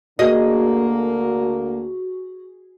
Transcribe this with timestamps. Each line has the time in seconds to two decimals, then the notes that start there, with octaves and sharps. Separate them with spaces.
0.19 D2 D3 A#3 F#4 G#4 D#5